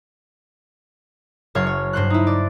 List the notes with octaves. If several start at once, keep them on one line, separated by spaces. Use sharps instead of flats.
F#1 C#5 F5 C#6
C#5
G2 C5 C6 F#6
D#4 E4
D5